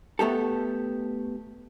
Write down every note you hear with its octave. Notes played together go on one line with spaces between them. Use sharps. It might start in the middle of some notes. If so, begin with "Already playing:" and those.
A3 B3 G4 A4